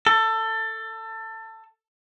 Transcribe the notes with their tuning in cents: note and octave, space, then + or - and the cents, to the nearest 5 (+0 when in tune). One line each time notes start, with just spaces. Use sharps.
A4 +20